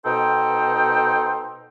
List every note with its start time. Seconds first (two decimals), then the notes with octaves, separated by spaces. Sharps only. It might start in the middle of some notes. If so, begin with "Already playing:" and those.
0.05 B2 D#4 A4 C5 G5